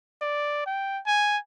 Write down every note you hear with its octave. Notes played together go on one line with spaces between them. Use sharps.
D5
G5
G#5